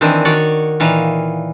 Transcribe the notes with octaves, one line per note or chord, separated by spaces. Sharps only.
D#3 E3 C4 D4
D#3 F#4 C#5 D5
A#2 D#3 E3 F5